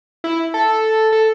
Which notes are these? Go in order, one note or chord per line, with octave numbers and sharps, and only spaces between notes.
E4
A4
A4